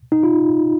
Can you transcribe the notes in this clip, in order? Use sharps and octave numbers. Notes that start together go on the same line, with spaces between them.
D#4
F4